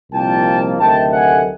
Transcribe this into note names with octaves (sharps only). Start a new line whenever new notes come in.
C2 A#2 F3 A#3 D#4 G5 A5
D2 C3 D#3 F#3 A3 G5 A5
F#5 G#5